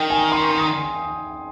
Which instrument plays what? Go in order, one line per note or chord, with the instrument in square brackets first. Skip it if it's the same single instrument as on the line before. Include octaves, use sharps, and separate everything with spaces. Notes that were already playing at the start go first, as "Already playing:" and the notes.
Already playing: [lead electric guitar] D#3 [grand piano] G5
[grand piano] G#5
C6
D#6